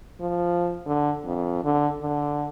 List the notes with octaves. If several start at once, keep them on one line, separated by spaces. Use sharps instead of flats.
F3
D3
F2
D3
D3